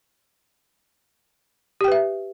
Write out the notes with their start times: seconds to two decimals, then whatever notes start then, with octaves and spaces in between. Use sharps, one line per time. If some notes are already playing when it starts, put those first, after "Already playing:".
1.81 G4
1.84 G5
1.88 B4
1.92 E5